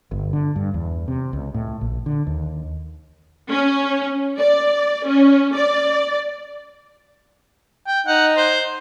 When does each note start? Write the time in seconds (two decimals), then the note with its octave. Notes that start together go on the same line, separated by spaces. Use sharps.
0.11 G1
0.33 D3
0.56 G2
0.74 E2
1.08 C3
1.33 C#2
1.54 A2
1.81 A#1
2.06 D3
2.27 D#2
3.50 C#4
4.39 D5
5.08 C#4
5.54 D5
7.87 G5
8.07 D#4 F#5
8.37 C5